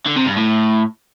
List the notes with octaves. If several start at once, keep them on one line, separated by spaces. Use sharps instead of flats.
D3
C3
G2
A2